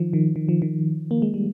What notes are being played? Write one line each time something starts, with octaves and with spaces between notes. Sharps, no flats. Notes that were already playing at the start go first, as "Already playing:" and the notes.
Already playing: D#3 F3
D#3
D#3
F3
D#3
A#3
G#3
G3